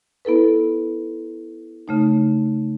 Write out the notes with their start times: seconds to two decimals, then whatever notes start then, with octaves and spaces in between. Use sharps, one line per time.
0.25 B3 E4 A4 B4
1.88 C#3 A3 D#4